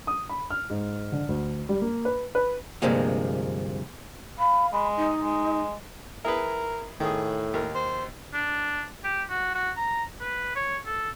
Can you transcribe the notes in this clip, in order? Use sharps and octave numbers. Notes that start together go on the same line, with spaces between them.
D#6
B5
F6
G#2
D3
D2
G3
A#3
B4
B4
D2 G2 C3 F3 G#3 A#3
F5 B5
G#3 B5
D#4
G#3
E4 G#4 A#4 B4
A2 D#3 G#4
D#2 A#4
C5
D4
G4
F#4
F#4
A#5
B4
C#5
A4